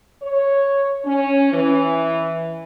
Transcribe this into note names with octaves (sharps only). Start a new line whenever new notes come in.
C#5
C#4
E3